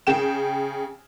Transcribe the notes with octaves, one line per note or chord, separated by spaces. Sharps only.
C#3 G5 E7